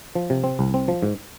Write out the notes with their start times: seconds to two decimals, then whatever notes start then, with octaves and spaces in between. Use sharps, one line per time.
0.15 F3
0.30 C3
0.44 C4
0.59 C2
0.74 C4
0.88 F3
1.03 G#2